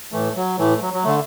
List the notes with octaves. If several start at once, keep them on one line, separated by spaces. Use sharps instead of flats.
A2 E3 A3
F#3
A2 E3 A3
F#3
F#3
D3 A3